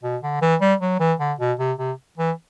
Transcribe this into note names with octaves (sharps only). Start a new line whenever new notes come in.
B2
D3
E3
G3
F#3
E3
D3
B2
C3
C3
E3